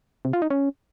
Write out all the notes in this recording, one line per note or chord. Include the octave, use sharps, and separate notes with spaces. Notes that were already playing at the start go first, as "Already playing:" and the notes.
C3
F4
D#4
C#4